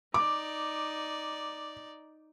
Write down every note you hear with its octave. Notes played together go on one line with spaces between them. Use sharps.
D#4 D5 D6